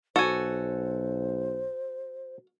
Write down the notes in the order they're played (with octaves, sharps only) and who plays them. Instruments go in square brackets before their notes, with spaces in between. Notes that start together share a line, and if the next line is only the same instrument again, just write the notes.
[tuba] B1 [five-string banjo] F#4 [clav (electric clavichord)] A4 G#5 [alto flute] C5